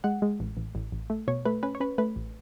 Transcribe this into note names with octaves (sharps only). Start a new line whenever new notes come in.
G#3 F#5
G#3
A1
A1
A1
A1
A3
B2 C#5
A3 B4
C#4 B4
C#5
C#4 B4
A3 B4
A1